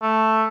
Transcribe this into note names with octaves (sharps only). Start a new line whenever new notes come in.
A3